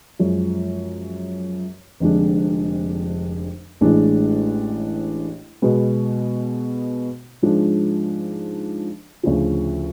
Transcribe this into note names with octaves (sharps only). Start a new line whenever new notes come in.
F#2 F3 G#3
F1 F2 D3 G#3 D4
A1 A2 G#3 D4 G#4
B2 G#3 B3 F#4
G#2 F3 G#3 D4 G#4
D2 C#3 F3